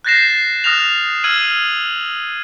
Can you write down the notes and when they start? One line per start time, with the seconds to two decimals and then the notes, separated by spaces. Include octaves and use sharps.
0.05 F#6 G6 A6 A#6 C7 E7
0.64 D#6 F6 F#6 A#6 F7
1.24 E6 F6 G#6 D#7 F#7